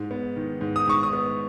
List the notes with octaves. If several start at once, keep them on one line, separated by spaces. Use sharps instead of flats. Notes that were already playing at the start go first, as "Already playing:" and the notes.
Already playing: G#2
B3
D#3
G#2
D#6
G#2 C#6
D#6
B3